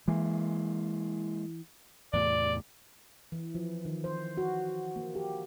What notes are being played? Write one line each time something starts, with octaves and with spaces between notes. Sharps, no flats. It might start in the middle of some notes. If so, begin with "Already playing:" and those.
E3 G#3 A#3
E2 A2 C3 D5
E3
F3
D#3
C5
F#4
A#3
G4